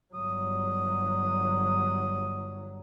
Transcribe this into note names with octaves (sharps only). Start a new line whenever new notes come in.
G1 F#3 D#6